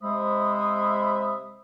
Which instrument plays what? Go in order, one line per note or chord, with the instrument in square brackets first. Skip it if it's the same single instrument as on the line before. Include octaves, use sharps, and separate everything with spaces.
[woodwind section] C3 G#3 C5 E5 B5 D#6